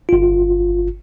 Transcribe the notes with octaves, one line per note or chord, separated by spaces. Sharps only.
G1 F4